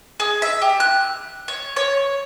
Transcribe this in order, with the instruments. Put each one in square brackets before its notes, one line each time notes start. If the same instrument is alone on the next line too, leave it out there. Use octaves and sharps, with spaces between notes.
[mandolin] G#4
E5
G4
F#6
C#5
C#5